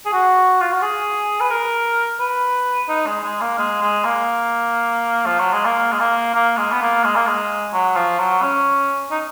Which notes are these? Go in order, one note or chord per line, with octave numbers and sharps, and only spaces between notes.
G#4
F#4
F4
F#4
G#4
B4
A#4
B4
D#4
G#3
G#3
A#3
G#3
G#3
A#3
F3
F#3
G#3
A#3
G#3
A#3
A#3
G#3
B3
A#3
G#3
A#3
G#3
F#3
F3
F#3
C#4
D#4